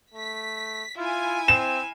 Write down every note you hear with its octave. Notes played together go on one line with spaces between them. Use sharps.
A3 B6
E4 F4 G#5
C4 E7